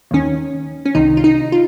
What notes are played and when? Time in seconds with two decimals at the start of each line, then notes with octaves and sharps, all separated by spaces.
0.11 D#2 D#3 C#4
0.86 C#4
0.95 C2 C3 D#3 D#4
1.17 F4
1.24 D#4
1.52 F4